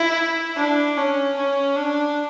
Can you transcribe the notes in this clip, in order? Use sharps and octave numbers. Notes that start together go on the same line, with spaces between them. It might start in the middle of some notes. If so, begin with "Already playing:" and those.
Already playing: E4
D4
C#4
C#4
D4